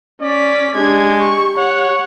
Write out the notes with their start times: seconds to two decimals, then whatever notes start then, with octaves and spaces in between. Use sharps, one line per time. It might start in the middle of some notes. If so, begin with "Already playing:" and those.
0.21 C#4 D5 B6
0.75 G#3 D4 G4 G#6
1.20 C#6
1.58 C#5 F#5